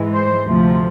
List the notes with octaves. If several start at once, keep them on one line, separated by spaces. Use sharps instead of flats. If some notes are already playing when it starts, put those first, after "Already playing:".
Already playing: G#2 E3 G#3
C5
D2 C3 F3 A3